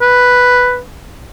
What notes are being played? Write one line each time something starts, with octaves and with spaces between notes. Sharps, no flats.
B4